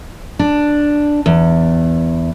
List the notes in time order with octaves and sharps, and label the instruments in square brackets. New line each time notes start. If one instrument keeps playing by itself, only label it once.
[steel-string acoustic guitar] D4
E2